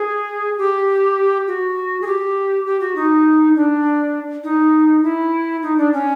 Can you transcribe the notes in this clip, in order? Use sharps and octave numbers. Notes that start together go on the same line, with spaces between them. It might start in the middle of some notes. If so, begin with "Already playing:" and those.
Already playing: G#4
G4
F#4
G#4
G4
G4
F#4
D#4
D4
D#4
E4
D#4
D4
C#4